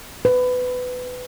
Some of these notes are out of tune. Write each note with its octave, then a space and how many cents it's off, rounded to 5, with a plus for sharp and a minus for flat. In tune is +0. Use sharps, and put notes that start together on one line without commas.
B4 +20